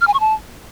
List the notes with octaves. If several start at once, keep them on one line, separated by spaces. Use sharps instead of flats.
F6
G#5
C#6
A5